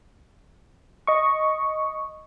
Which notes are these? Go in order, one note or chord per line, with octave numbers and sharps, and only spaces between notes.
D#5 C#6